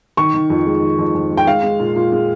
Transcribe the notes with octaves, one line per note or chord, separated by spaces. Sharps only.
D#3 C#6
D#3
F2
G#3
D#3
F2
F2
G#3
G5
G#3 F5
G#3
A#2
A#2
G#3